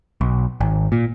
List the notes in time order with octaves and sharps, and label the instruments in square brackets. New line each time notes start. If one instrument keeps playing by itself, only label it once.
[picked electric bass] B1
G#1
A#2